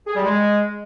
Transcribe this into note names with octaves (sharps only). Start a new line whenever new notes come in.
G#4
G3
G#3